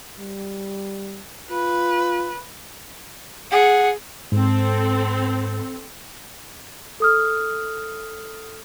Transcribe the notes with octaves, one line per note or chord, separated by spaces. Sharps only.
G3
F4 B4
G#4 F#5
G#2 C4 A4
A4 D#6 F6